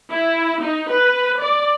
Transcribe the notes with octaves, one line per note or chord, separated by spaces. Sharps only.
E4
D#4
B4
D5